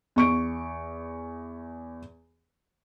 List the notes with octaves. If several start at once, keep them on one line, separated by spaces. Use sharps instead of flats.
E2 C#6 D7